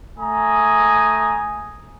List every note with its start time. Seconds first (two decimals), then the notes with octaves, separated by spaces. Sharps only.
0.18 A3 G#5 A#5 D#6